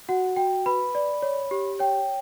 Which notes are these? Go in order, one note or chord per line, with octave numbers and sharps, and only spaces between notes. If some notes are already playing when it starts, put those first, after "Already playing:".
F#4 F#5
F#4 G5
B4 B5
D5
C#5
G4
C#5 G5